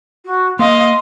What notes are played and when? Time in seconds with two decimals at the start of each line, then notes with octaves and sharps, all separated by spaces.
0.25 F#4
0.59 A#3 D#5 F5 C6